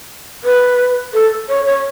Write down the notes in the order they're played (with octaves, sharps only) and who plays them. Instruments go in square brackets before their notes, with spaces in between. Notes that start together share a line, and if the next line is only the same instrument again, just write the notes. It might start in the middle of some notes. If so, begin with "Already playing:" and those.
[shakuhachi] B4
A4
C#5
C#5